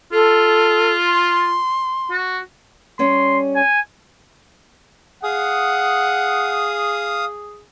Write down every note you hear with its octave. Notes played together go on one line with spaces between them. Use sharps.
F4 A4
C6
F#4
G3 C#4 C#5 C6
G#5
G#4 F5 F#5 D#6